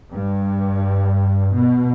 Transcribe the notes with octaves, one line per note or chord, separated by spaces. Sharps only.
G2
B2